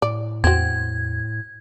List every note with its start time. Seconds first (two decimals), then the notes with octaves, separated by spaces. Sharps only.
0.02 A2 D5
0.44 E2 C4 F#4 G#6